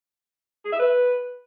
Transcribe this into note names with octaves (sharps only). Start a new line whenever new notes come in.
G#4
E5
B4